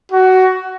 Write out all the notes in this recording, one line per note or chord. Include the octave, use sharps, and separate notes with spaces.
F#4